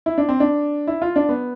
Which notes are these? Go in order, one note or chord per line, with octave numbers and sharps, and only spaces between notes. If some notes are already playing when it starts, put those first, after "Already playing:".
E4
D4
C4
D4
E4
F4
D4
B3